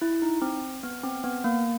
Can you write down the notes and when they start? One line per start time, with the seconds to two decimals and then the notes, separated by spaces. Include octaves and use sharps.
0.02 E4
0.22 D#4
0.42 C4
0.83 B3
1.03 C4
1.24 B3
1.44 A#3